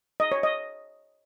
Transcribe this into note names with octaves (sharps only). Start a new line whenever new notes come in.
D#5
C#5
D#5